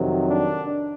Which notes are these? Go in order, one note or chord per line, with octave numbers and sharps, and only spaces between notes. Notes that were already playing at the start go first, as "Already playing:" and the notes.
Already playing: F2 C3 D#3 F#3
D4